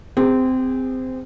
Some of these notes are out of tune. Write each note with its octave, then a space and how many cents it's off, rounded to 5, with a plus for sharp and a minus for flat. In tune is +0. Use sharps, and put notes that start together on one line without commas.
C4 -20 G#4 -40